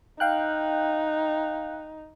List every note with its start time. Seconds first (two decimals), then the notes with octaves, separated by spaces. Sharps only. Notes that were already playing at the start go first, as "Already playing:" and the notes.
0.20 D#4 F5 G5 F#6